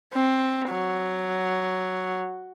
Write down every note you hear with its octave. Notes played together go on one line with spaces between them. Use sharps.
C4
F#3